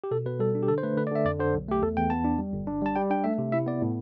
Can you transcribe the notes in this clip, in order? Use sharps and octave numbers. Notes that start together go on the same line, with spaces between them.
G4
B2 A4
B2 B4
G3 A4
D4
G4
D3 A4
C5
A3 B4
D3 B4
D5
D3 E5
F2 D5
D3 C5
B1
A3 G4
E2 A4
E2 G5
B3 A5
D4
G3
G1
D4
G3 A5
G3 G5
D4 G5
A3 E5
C3
E4 E5
B3 D5
A2